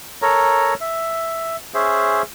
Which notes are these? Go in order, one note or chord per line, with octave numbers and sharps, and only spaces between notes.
A4 A#4 C#5 A#5
E5
C#4 G#4 C5 E5